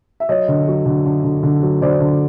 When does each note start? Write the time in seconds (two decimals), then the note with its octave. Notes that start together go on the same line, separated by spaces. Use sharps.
0.20 E5
0.29 F#3 C#5 D#5
0.48 D3
0.68 F#3
0.86 D3
1.06 D3
1.24 D3
1.43 D3
1.63 F#3
1.82 D3 C5 D5
2.00 D3